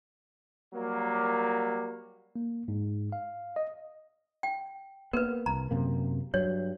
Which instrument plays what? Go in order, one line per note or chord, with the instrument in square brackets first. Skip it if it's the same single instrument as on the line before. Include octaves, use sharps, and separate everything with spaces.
[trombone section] F#3 G3 A#3
[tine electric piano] A#3
G#2
F5
D#5
[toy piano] G5
[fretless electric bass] A#3 B3 [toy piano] A#4 B4
[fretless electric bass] C2 [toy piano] A#5
[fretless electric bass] F#2 C3 A#3
[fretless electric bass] G2 F#3 [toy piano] C#5